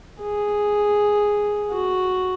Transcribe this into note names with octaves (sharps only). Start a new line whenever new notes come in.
G#4
F#4